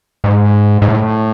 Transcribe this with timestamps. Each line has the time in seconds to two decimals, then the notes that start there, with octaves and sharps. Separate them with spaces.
0.24 G#2
0.82 G#2
0.88 A2